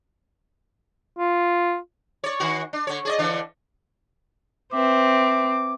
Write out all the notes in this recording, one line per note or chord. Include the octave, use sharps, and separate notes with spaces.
F4
C#5 D5
D#3 F#4
D4
D3 C#5
G#4 D5 D#5
D3 E3 D4
C4 B4 E5 D6